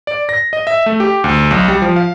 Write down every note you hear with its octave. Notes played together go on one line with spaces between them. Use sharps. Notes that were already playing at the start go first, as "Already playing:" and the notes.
D5
A#6
D#5
E5
A3
G4
D2
B1
G3
F3
F5